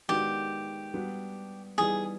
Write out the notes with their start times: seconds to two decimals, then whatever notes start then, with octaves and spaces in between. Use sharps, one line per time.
0.08 D#3 G#3 B3 D4 F#4 G4
0.94 G3 B3 D4 F#4
1.78 E3 G3 B3 D#4 G#4